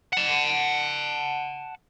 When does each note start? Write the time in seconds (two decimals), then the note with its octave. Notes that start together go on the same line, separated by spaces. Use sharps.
0.13 F#5 A5